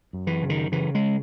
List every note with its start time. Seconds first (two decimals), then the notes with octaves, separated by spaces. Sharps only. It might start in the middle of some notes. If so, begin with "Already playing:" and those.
0.13 F#2
0.27 E3
0.43 C#3
0.50 D#3
0.72 C#3 E3
0.95 G#3